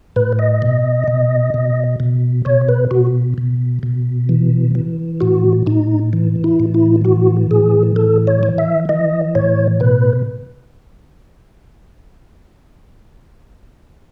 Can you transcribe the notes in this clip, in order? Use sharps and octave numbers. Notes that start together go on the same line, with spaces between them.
A2 B4
D#5
B2
B2
B2
B2
B2 C#5
B4
B2 F#4
B2
B2
E3
E3
A2 F#4
A2 D#4
E3
E4
A2
E4
E3 F#4
A2 G#4
E3 A4
C#5
E3
E5
E3 D#5
A2 C#5
B2 B4